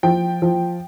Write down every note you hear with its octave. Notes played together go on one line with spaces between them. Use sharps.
F3 G5
F3